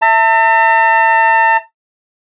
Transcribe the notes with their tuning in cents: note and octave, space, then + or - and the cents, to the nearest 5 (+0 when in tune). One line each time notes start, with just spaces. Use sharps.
E5 +0 A5 +45